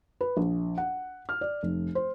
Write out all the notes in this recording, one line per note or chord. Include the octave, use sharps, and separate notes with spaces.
B4
A#1
F#5
F6
D5
F1
C5